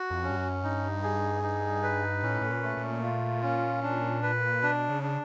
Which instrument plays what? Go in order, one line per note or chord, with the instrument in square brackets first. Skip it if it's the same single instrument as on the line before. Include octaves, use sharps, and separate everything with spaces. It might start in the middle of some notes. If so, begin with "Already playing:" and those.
Already playing: [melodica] F#4
[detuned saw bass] F2
[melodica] C#4
[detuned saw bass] G2
F#2
[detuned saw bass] G2 [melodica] D#4
[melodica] G#4
D#4
B4
[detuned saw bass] A2 [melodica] C#4
[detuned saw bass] A2
A#2
[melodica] A3
[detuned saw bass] A#2
[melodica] F4
C#4
D4
B4
[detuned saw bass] B2 [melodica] D4
[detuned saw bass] C#3
[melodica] D4